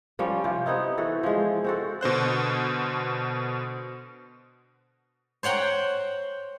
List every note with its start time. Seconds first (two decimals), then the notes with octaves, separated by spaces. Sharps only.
0.19 F3 G3 C#4
0.44 C3 F3 F4
0.66 B3 C4 D#4 E4
0.98 E3 F#4 A4
1.23 F3 G#3
1.64 C4 F#4 A4
2.01 B2 D3 C5 F#6
5.43 C5 C#5 F#5 G5 A#5